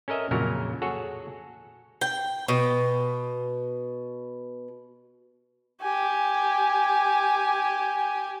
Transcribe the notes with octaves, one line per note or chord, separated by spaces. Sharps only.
C#4 A4 A#4 D#5 E5
F2 A#2 C#3 F#3 A#4
F#4 G#4 A4 C#5 F#5
G5
B2
G4 G#5